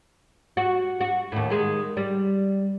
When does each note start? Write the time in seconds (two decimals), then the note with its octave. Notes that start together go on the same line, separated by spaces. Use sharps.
0.57 F#4
1.01 F#4
1.32 D#2 A2
1.50 D#3 G#3
1.97 G3